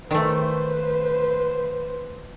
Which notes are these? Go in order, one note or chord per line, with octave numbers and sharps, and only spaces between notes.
D#3 A3 B4 C5